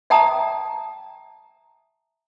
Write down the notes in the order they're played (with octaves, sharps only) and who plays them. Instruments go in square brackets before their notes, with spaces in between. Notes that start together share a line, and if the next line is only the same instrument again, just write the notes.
[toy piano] E5 G5 A5 A#5 D#6